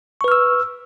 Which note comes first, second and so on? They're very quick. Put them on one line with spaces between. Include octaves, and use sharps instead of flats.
C#6 B4 F6 E6